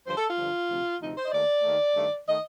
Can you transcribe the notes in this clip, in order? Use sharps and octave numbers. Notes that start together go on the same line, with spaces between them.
G2 D3 F3 C5
A4
F4
G2 D3 F3
D2 C3 F3 C4
D2 C3 F3 C4 D#4
C5
D#5
D#2 D#3 A3 D5
D#2 D#3 A3
G2 D#3 A3
D#3 A3 D#5